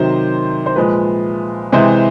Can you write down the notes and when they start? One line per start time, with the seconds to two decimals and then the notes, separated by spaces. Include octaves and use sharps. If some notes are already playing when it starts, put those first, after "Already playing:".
Already playing: C3 D#3 F#3 C5
0.66 C5
0.76 A#2 F3 G#3 B4
1.72 C3 E3 G#3 C5